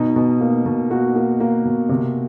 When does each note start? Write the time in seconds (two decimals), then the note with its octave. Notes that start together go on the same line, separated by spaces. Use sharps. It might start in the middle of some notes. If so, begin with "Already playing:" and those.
Already playing: B2 D#4
0.16 B2
0.41 A#3
0.66 B2
0.91 A#3 F#4
1.16 A#3
1.40 A#3
1.65 B2
1.89 C3